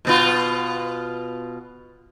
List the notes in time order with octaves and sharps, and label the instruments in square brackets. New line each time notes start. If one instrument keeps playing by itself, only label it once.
[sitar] B2 B3 F4